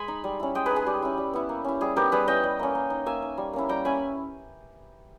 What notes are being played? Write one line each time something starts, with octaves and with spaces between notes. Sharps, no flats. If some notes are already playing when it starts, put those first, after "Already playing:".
Already playing: G#3 G#5 B5
D#4
G3
C#4 E4
G#3 D#5 G5
D#4 G#4 B4
G#4
G3 G4
C#4 E4
G3
B3 E4
A#3
C#4 E4
G3 G#4
B3 D#4 G4 A#4
G3 G#4 B4
C#4 E4 D#5 G5
G3
A#3 C#4
A#3
D#4
A#3 E5 G#5
D#4
G3
A#3 C#4 E4
G3 G5 A#5
C#4 E4 G#5 B5